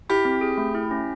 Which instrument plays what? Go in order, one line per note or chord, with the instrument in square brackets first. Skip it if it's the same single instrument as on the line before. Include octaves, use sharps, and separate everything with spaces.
[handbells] E4 [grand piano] G4
[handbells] C4
G#4
A3
E4
C#4